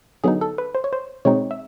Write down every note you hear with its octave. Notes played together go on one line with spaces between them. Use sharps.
D3 F#3 B3 D#4 G#4
A4
B4
C5
C#5
C5
B2 G#3 C4 D#4 C#5
E5